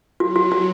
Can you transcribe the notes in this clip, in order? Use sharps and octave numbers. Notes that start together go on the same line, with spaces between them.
F#3 F#4
F#4
F#4